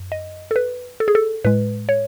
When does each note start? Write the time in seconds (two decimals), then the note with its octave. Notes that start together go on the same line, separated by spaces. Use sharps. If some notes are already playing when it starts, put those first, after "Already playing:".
Already playing: F#2
0.12 D#5
0.51 A4
0.56 B4
1.00 A4
1.08 G#4
1.15 A4
1.45 A2 G#3 B4
1.89 C#5